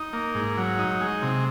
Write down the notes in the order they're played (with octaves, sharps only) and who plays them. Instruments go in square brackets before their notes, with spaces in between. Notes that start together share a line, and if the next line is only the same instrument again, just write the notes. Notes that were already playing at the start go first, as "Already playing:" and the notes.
Already playing: [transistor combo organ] D#4
A#3
G#2
F#3
D#4
G#3
C3